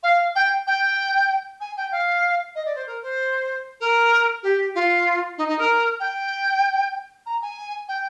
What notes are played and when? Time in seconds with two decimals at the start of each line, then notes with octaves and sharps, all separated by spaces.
0.03 F5
0.35 G5
0.67 G5
1.60 G#5
1.76 G5
1.91 F5
2.55 D#5
2.65 D5
2.75 C5
2.86 A#4
3.02 C5
3.80 A#4
4.43 G4
4.75 F4
5.37 D#4
5.48 D#4
5.58 A#4
5.99 G5
7.26 A#5
7.42 G#5
7.88 G5